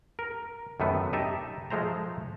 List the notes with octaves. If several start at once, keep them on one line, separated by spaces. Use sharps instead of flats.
A#4
F#2 D#3 A3 B3
D#4 G4 E5 A5
F3 G#3 A3 C5 A#5